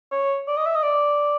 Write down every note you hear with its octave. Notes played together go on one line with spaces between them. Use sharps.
C#5
D5
D#5
E5
D#5
D5